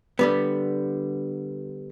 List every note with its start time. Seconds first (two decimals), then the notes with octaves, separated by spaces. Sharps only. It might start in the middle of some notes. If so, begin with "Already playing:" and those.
0.19 D3 G3 B3